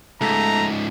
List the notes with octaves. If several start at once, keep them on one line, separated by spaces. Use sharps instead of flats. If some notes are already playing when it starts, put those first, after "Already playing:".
C#2 G#2 A3 A#5